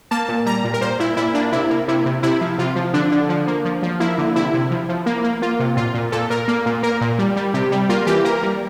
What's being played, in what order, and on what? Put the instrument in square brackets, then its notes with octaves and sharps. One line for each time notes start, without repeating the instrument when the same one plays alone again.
[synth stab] A#3 A5
A#2
G3 A#5
A#2
A#4
A#2 C5
A#2 E4
A#2 E4
A#3 D4
C3 E4
A#3
C3 E4
C3
C3 E4
F3
C3 F4
F3
D3 D4
D3
F3
A#3
F3
F3
A#3 E4
D3
C3 E4
C3
F3
F3
A#3
A#3
A#3 F4
C3
A#2 F4
A#2
A#2 A4
A#2 A#4
A#3
A#2
A#3 A#4
A#2
G3
G3
C3 G4
G3
A#3 F4
E3 G4
A#3 A#4
G3